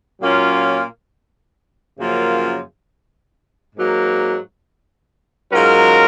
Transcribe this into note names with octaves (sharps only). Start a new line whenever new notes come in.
A#2 F#3 A#3 C#4 F4
F#2 C#3 F3 A#3 F4
G#2 F#3 A#3
G#2 F#3 C#4 F4 A#4